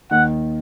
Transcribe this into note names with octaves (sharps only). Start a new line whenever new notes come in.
D#2 D#3 F#5